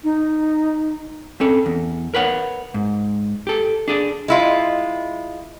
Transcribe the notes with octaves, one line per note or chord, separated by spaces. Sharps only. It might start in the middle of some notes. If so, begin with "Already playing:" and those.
D#4
C4 C#4 A4
E2
A#4 B4 C#5 F#5
G#2
G4 A4
D4 G#4 D5
G#3 E4 F4